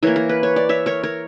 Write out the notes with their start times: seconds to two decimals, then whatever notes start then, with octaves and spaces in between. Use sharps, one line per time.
0.03 E3 A#3 A#4 C#5
0.16 A#4
0.29 B4
0.43 C#5
0.56 D5
0.69 C#5 E5
0.86 A#4 C#5
1.03 A#4 C#5